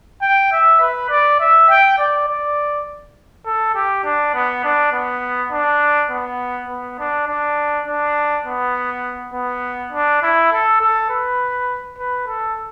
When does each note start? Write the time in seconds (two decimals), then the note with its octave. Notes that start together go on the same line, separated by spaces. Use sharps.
0.22 G5
0.52 E5
0.81 B4
1.10 D5
1.40 E5
1.70 G5
1.98 D5
2.28 D5
3.46 A4
3.75 G4
4.04 D4
4.34 B3
4.64 D4
4.93 B3
5.52 D4
6.10 B3
6.69 B3
6.99 D4
7.27 D4
7.86 D4
8.46 B3
9.33 B3
9.92 D4
10.23 E4
10.52 A4
10.81 A4
11.10 B4
11.98 B4
12.27 A4